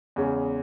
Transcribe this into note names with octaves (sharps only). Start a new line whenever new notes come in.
E2 C#3 G#3 C#4